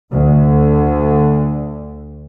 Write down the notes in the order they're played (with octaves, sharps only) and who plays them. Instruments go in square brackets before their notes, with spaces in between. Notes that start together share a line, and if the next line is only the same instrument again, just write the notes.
[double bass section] D2 D3